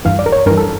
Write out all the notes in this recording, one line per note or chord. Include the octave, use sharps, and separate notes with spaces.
G2 E3 F5
D5
A#4
C#5
G2 E3 A#4
A4